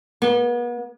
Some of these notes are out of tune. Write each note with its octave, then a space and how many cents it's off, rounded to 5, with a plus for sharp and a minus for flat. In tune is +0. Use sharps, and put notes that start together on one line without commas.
B3 -40